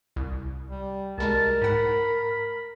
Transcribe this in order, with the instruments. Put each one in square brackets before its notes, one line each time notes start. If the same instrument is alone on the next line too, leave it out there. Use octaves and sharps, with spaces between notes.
[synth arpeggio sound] C2
[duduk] G3
[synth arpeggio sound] C2 G3 G#3 [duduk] A#4 [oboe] A5
[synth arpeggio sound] G#2 F#5 [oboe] B5